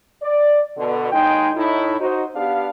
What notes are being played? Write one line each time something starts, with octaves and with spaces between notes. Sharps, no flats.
D5
B2 D3
D#2 G#3 D#4 G5
A2 D#4 E4
D#4 F#4 C5
B3 D4 G4 F5